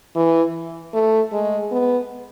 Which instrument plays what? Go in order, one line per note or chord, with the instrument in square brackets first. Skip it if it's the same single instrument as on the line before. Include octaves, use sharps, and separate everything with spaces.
[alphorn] E3
A3
G#3
B3